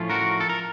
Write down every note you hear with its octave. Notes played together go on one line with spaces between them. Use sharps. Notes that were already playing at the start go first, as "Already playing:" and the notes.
Already playing: A2 F3 A3 C#4 F4
F#4 A#4
A4
A#4